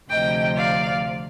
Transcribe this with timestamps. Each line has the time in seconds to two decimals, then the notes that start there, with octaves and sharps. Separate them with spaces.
0.10 D2 C3 F3 D#5 G5
0.56 D5 F5